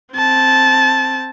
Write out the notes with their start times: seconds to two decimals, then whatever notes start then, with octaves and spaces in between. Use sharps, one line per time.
0.14 C4 A5